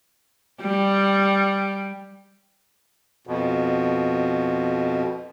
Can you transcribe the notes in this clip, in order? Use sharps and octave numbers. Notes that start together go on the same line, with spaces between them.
G3
F2 B2